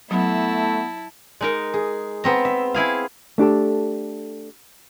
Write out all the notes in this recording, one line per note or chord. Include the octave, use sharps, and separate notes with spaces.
F#3 A3 B3 E4 A5 B5
G#3 D#4 A#4
G#4
B3 C4 A#5
E5
E4 G#4 F5
A3 D4 G4 A4